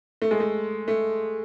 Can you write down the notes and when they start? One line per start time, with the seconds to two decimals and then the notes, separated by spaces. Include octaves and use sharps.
0.22 A3
0.31 G#3
0.40 A3
0.88 A3